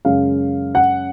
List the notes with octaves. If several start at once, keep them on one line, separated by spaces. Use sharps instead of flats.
F#2 C#3 G#3 F5
F#5